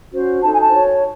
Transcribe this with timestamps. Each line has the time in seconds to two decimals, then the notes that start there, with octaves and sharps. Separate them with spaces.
0.12 C#4 F#4 C5
0.43 D#4 A4 C5 A5
0.52 G#5
0.60 A5
0.72 F#4 C#5